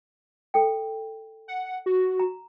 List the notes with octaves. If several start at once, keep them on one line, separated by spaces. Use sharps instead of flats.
A4 G5
F#5
F#4
A#5